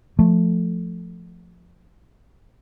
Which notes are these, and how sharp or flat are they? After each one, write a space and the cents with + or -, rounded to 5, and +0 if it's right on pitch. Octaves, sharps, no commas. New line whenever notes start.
F3 +0 A3 +0